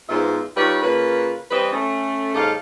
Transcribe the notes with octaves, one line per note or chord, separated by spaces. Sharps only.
E2 G#2 B3 F4 C5 E5
G3 D#4 F4 B4 C#5
C#3 A#3 F4 B4
E3 G3 C4 B4 D#5
A3 C#4
D#2 G#2 D#4 A4 F5